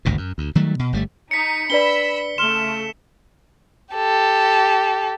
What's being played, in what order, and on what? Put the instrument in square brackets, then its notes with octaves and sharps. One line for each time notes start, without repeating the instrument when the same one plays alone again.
[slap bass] G#1 D2 G2 B2
F#2
D2
D#3 F#3 G3 A3
B2
G1 G3 A3
[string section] D#4 [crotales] B6 C#7
[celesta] D4 B4 D5 [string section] B5 E6 [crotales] G7
[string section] C#3 A3 [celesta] C6 F6 G7 [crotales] E7
[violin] G4 A4